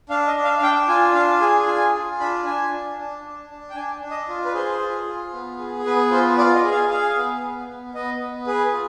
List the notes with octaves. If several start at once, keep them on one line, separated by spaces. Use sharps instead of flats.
D4 F5
D#5
D4
F5
F5
D4 G5
F4 G#5
D4 F5
G#4 G#5
F4 G#5
F4
D4 B5
D4 G#5
D4
D4
D4
D4
G5
D4 G#5
D4
D#5
F4
B4
G#4 C5
F4
F4
B3
G#4
B3 B4
F4 C5
F4 D5
D#5
G#4
F5
G#4 F5
B3
B3
B3
B3 D#5
B3
G#4 B4
F4